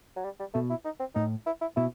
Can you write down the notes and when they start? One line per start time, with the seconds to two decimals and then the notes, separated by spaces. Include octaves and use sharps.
0.16 F#3
0.24 G3
0.40 G3
0.54 B2 A3
0.70 E4
0.85 D#4
1.00 C4
1.15 A2 D#4
1.46 E4
1.61 E4
1.76 B2 E4